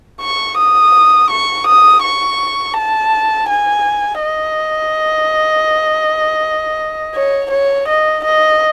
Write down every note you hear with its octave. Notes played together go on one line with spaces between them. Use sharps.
C#6
D#6
C#6
D#6
C#6
A5
G#5
D#5
C#5
C#5
D#5
D#5